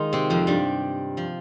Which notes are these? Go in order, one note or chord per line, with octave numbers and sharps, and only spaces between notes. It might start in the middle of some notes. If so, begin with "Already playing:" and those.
Already playing: D#3 G#3 D#4 F4 G#4
C3 C4
F2 F3
G2 G3
F3